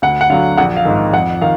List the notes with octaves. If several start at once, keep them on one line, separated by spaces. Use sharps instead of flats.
D2 F#5
F#5
D3 F#3 F5
A#1 F#5
F5
G#2 D#3
F5
F2 F#5
D#3 F5